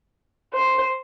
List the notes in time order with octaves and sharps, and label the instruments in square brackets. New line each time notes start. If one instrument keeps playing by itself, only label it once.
[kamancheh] C5